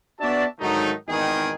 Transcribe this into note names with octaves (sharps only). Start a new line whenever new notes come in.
B3 D4 F#4 D5 E5 A5
G#2 D3 D#3 F#3 A3 D#4
G#1 E2 D#3 D#4 G#4 G5